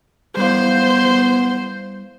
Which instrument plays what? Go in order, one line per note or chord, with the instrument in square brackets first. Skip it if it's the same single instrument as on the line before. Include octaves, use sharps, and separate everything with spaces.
[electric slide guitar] G3 E4 F5 [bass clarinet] B3 [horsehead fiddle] C5